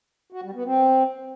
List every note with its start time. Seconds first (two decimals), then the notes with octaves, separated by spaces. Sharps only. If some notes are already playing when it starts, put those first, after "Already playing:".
0.32 F#4
0.43 G3
0.54 B3
0.66 C4